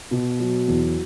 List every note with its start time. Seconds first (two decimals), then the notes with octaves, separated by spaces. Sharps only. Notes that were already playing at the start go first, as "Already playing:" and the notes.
0.11 B2
0.39 F#3
0.68 E2